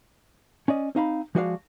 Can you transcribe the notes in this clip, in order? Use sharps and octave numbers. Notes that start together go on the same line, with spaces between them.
C#4 D5 D#5
C4 D#4 F5 B5
F3 G#3 F#4 D5 D#5 F5